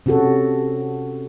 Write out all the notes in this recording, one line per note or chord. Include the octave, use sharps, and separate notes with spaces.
C3 C#4 F#4 A4